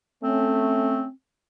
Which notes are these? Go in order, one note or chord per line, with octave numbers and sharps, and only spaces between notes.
A3 C4 C#4